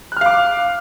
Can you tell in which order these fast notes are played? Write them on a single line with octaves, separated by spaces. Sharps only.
F#6 F6 F5 D6